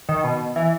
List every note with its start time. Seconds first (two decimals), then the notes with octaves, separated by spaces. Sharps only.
0.09 D#3
0.24 B2
0.56 E3